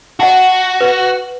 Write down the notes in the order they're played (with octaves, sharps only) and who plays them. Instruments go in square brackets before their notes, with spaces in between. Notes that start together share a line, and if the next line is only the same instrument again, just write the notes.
[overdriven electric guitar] F#4 [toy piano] D#5 F#5 A5
[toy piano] B4